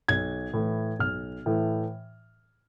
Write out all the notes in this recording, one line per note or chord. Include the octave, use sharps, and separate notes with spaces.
B1 G#6
A2 E3
B1 F6
A2 E3